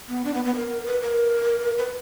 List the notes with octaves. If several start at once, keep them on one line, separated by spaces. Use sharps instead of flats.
B3
D4
B3
B3
A#4
B4
A#4
B4